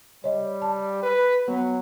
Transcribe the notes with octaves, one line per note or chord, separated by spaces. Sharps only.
G3 C#5 D#5
A5
B4
F#3 B3